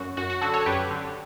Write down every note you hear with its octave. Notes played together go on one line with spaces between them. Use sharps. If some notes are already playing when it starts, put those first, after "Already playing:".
Already playing: F#2 F#4
F#2 F#4
F#4
D3 F#4 A4
A4 C#5
F#2 G4 B4
D3